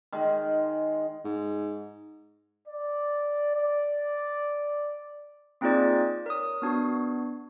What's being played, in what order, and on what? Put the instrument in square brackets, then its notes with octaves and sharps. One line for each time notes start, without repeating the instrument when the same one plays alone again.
[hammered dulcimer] D#3 G#3
[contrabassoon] G#2
[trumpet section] D5
D5
[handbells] A#3 C4 D#4 F4 G#4 D5
A#4 C#5 D#6
B3 D4 F#4